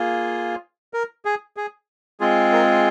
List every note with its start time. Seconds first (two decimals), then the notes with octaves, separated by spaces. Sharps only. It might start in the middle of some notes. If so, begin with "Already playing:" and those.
Already playing: A#3 F4 G#4
0.94 A#4
1.25 G#4
1.57 G#4
2.20 G#3 C4 F4 G#4
2.52 A#4